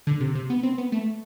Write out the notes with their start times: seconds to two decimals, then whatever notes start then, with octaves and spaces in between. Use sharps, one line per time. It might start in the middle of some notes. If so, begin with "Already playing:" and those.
0.07 D3
0.20 C3
0.35 C3
0.50 B3
0.63 C4
0.78 B3
0.92 A3